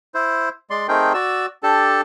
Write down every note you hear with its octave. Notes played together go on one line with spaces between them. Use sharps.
E4 C5
G#3 D5 C6
A3 C4 D#4 G#4 A#4 G5
F#4 D5 E6
D4 G4 A4 A5